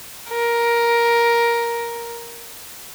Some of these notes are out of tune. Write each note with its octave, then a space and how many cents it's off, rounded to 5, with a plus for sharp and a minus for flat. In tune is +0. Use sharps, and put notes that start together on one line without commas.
A#4 +10